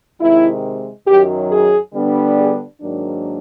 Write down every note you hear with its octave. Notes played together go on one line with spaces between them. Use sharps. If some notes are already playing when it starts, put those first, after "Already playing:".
C3 D#3 G#3 E4
F#2 D#3 F#3 G4
G#4
D3 G3 B3 D4
G#4
G#2 D#3 F#3 A#3 D4